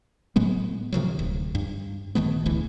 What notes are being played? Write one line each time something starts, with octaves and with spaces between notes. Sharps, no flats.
A2 F#3 G#3 B3
C3 D#3 F3 F#3
D1
G2
A#1 D#3 A3 B3
E1 A1 D2 E3